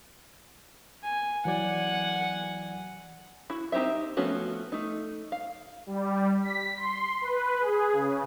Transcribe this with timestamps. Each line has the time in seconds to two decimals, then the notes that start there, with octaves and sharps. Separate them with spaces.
1.03 G#5
1.45 E3 F#3 D5 F#5 G#5
3.50 E4 F#4
3.72 C4 D#4 G4 C5 E5
4.17 F3 A3 B3 C#4 F#4
4.72 A3 D#4
5.32 F5
5.87 G3
6.43 B6
6.77 C6
7.21 B4
7.60 G#4
7.93 C#3